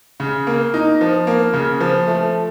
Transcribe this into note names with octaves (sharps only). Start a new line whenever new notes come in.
C#3
A#3
D#4
F3
A#3
C#3
F3
A3